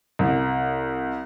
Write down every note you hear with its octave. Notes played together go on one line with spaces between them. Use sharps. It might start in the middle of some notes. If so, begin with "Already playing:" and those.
C2